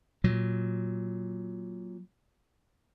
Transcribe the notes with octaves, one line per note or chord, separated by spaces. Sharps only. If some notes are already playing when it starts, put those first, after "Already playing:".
A#2 F#3